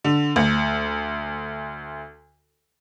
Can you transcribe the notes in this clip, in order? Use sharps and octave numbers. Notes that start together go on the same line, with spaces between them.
D3
D2